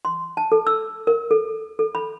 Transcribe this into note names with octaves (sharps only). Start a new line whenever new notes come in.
C6
A5
A4
E6
A#4
A4
A4
B5